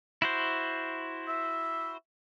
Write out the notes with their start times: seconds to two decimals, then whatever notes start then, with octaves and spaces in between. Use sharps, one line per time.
0.22 E4 F#4 C5
1.28 E5